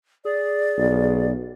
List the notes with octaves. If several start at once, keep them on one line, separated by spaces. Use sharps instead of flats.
G#4 D5
B1